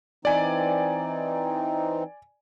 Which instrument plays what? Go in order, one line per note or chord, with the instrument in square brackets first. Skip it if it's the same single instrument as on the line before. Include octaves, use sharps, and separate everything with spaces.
[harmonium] E3 C4 D#4 [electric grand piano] D5 G#5